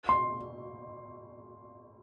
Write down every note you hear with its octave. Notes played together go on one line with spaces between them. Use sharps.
C6